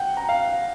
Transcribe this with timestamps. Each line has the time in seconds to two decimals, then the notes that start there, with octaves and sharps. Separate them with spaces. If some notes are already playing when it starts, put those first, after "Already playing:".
Already playing: F#5 G5
0.17 A#5
0.29 F5